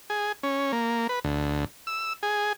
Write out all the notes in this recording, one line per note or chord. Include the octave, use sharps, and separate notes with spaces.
G#4
C#4
A#3
B4
D2
E6
G#4